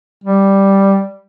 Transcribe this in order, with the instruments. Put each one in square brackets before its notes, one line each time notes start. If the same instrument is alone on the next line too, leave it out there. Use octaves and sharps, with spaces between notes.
[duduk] G3